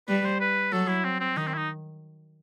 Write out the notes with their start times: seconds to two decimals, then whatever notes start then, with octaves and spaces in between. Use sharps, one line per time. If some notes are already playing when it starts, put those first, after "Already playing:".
0.08 G3 B4
0.25 C5
0.40 B4
0.72 F#3 A4
0.88 E4
1.04 C4
1.20 C4
1.37 D#3 D#4
1.47 C4
1.54 E4
1.58 D#4